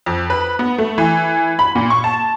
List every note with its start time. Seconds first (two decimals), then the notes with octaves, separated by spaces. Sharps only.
0.06 F2
0.30 B4
0.59 B3
0.78 A3
0.98 E3
1.59 B5
1.75 A#2
1.90 C#6
2.04 A5